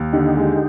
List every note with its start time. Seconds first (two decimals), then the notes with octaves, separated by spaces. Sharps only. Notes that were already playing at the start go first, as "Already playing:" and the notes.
Already playing: D#2
0.13 D3 D#4 G4
0.36 G#3